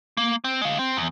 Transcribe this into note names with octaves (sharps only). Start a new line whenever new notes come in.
A#3
C4
G#3 F5
C4
E2